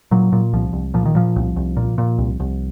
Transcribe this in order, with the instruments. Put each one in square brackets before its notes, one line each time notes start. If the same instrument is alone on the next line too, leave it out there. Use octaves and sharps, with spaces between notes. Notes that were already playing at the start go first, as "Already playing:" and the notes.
[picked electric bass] A#2 F#3
A#2
C2 F3
C2
A#2 F3
D#3
A#2 F3
C2
C2
A#2
A#2
C2
C2